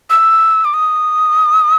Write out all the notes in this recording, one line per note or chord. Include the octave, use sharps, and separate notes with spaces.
E6
D6
D#6